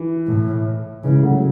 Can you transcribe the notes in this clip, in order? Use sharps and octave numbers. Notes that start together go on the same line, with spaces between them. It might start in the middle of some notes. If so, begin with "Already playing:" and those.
Already playing: E3
A2
C#3 E3 G#3
F#3 A3